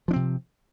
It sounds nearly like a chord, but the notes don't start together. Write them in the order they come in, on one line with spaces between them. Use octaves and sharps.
F3 D4 C4 C3